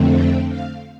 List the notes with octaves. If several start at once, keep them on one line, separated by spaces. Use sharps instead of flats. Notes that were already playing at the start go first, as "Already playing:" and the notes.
Already playing: F2 D3 A3 C4
G5
F5